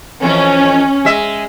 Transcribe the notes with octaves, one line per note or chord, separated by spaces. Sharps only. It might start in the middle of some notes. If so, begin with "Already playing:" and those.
F2 E3 C#4
G#3 E5